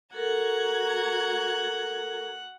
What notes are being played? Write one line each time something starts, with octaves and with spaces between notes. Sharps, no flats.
F#4 A4 A#4 F#5 A#5 G#6